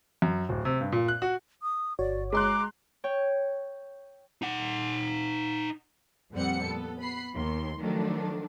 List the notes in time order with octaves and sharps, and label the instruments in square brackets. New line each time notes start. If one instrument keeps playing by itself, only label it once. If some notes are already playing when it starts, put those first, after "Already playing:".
[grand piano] F#2
D1
C3
G2
A#2
F#6
F#4
[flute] D#6
[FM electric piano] G1 F#4 C#5 [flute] D5
[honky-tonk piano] G#3 C6 F#6 [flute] A#5 [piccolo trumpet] D6
[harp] C#5 G5
[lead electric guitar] D#4 F#5
[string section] F2 A#2 G3 C4 F#5 C#7
B3 A4
B3 B5 C7
D#2 C6
D#3 F3 F#3 A3 D4